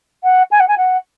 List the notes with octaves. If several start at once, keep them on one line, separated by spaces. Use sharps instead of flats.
F#5
G#5
F#5
G#5
F#5